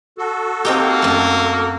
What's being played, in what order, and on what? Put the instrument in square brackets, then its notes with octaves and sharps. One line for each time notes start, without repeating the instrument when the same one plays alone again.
[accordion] F#4 A4
[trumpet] A#3 [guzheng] C4 D#4 G4
[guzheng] F#2 A3